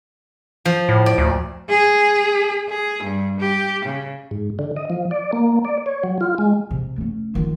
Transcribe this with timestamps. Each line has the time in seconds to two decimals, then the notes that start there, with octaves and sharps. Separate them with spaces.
0.65 F3
0.89 A2
1.06 D5
1.18 D2
1.69 G#4
2.69 G#4
3.03 G2
3.40 G4
3.85 C#3
4.31 G#2
4.59 D3
4.76 D#5
4.90 F3
5.11 D5
5.33 A#3
5.65 D5
5.86 C#5
6.04 F#3
6.21 F4
6.38 G#3
6.71 C3
6.98 A3 C#4
7.35 D#3 F4